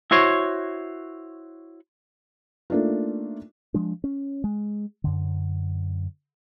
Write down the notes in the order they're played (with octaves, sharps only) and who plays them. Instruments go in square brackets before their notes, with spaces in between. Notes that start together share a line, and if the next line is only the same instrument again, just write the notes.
[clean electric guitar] E4 F#4 C5 C#5
[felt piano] A3 A#3 D4 D#4 F4
[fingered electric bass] F3 G#3 D4
C#4
G#3
F#2 D3